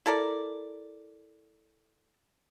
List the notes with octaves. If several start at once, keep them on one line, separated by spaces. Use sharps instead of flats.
E4 A4 A#4 D5